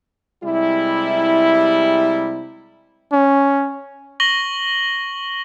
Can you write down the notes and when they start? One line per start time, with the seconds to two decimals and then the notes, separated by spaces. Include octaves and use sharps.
0.43 C3 G3 G#3 E4
3.12 C#4
4.20 C#6 A#6 F#7 G7